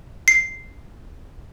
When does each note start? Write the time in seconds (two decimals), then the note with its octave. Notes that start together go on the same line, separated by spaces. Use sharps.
0.28 C7